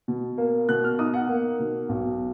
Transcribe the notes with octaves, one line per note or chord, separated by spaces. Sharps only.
B2
A#3
B2 F#6
F6
D#4 D#6
F#5
A#3
B2
B1